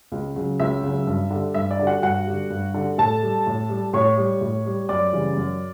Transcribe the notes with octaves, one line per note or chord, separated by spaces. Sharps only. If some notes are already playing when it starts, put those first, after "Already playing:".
C#2
C#3 F#3
C#2 E5
C#3 F#3
G2
D3 G3
G2 E5
D5
D3 G3
F#4 F#5
G2 F#4 F#5
D3 G3
G2
D3 G3
A2 A4 A5
G3
A2
G3
A2 C#5 C#6
G3
A2
G3
F#2 D5 D6
C#3 E3 G3
F#2